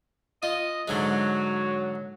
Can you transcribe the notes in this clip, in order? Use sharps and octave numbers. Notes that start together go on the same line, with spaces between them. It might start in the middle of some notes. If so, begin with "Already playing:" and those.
F4 D#5
G#2 D3 F#3 G#3